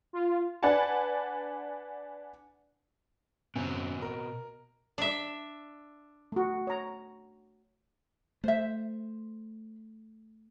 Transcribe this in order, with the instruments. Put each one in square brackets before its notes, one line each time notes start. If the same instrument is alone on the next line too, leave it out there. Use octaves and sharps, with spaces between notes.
[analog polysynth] F4
[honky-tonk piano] D4 B4 D5 F#5 G#5 A5
[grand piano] F#2 [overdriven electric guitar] B2 C4
[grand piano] A#4
[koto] D4 E5
[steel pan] A3 F#4
C#5 A#5
[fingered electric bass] A3 [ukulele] C5 E5